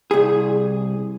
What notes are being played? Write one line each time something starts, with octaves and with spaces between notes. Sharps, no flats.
C2 G#4